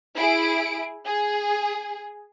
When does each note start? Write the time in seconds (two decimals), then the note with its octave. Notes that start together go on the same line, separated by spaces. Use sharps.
0.16 E4 G#4 D7
1.07 G#4